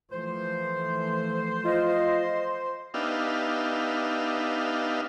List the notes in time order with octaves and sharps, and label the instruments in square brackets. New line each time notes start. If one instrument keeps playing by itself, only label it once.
[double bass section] E3 F3 A3 [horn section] C5
[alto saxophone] F4 [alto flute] D#5
[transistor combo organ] B3 D4 D#4 G4 E5 F5